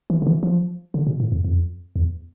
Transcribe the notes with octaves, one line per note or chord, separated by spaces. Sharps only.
E3
D3
E3
F3
D3
B2
A2
F2
F2
E2